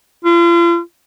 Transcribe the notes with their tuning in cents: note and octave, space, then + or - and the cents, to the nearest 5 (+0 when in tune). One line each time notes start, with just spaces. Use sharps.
F4 -40